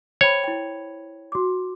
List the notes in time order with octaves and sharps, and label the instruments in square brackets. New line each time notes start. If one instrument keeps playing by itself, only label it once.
[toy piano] C5 G5 B5 [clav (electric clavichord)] C#5
[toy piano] E4 G5
F#4 D6